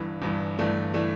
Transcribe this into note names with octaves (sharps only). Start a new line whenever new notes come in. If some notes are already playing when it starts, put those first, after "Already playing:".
Already playing: G1 G2 E3
G1 G2 E3
G1 G2 E3 A3 D4
E3 A3 D4